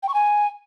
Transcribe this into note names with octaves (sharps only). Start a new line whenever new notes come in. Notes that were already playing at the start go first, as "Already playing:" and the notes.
G5
C#6
G#5